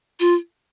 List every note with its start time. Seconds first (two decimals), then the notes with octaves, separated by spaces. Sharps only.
0.20 F4